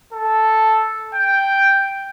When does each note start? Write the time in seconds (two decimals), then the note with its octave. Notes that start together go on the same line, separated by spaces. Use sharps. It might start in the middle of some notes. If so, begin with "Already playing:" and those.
0.13 A4
1.15 G5